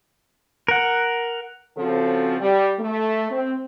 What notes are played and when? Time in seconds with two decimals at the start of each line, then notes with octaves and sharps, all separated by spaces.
0.68 A#4 F#5
1.77 C#3 F3 C4 F#4 A4
2.39 G3
2.79 A3
3.31 C4